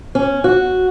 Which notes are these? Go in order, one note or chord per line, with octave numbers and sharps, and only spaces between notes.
C#4
F#4